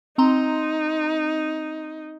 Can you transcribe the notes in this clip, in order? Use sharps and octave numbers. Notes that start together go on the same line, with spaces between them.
C4 D#4 A#5 C6